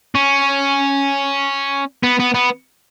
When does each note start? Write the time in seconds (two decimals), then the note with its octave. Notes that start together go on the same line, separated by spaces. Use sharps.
0.15 C#4
2.04 B3
2.20 B3
2.34 B3